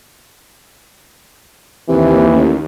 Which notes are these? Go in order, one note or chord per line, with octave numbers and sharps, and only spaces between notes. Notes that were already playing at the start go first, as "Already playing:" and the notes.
D#2 C3 E3
A1